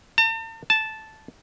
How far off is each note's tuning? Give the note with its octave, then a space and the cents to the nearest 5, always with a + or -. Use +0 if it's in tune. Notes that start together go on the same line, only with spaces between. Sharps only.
A5 +45
A5 -5